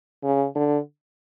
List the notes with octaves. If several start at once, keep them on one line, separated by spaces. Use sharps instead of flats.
C#3
D3